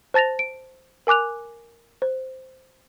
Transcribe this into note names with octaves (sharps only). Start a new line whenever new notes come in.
C5 A5 A6 A#6 F7
D7
A#4 G#5 D6 F#6 F7
C5